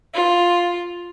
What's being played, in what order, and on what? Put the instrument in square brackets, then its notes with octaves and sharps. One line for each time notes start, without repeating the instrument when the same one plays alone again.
[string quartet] F4